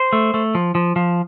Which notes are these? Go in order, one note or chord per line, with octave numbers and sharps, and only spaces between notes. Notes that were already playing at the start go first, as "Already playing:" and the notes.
Already playing: C5
A3
A3
F3
F3
F3